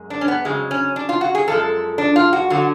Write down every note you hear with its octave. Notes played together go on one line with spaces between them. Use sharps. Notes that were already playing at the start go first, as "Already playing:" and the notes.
Already playing: F#2 G#3
D4
C#4
B3
F2 C#3 F#3 G#3
C#4
D4
F4
F#4
G#4
F#2 F3 G#3 A4
D4
F4
F#4
D3 F#3 F#4